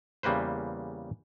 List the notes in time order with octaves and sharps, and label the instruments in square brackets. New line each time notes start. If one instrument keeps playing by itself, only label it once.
[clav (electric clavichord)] E2 C#3 G3 A#3 B4 C5